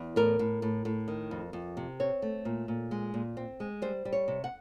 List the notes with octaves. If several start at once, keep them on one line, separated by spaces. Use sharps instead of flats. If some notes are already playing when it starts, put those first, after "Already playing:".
Already playing: E2
A2 A#4
A2
A2
A2
D#3
F2
F2
C3
C4 C#5
A3
A#2
A#2
G#3
A#2
C4
G#3
G3 C5
G3
C#5
C3
F#5